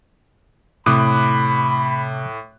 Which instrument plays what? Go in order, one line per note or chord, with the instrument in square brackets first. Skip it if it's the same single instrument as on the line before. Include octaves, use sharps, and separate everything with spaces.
[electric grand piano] A2 D6 F#6 [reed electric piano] C3 D#6 [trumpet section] B5